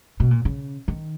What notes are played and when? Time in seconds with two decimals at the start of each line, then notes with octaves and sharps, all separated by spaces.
0.20 B2
0.31 A#2
0.45 C#3
0.88 D#3